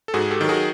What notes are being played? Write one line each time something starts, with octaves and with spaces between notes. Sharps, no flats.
A4
G#2 F#4 G#4
G4 A4
D#3 F#3
F#4 G#4